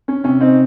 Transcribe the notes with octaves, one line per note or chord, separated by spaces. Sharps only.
C#4
C3 C#4
C4 D#4